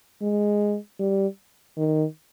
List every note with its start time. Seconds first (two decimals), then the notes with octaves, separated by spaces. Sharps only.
0.22 G#3
0.99 G3
1.77 D#3